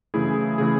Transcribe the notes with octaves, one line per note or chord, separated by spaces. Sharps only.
F#2 C#3 E3 A3 E4 G#4
C#3 E3 A3 E4 G#4